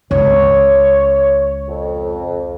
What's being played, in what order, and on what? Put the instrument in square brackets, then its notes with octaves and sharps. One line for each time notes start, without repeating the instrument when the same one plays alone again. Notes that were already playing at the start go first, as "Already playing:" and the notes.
[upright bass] C#2 [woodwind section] C#5
[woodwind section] F2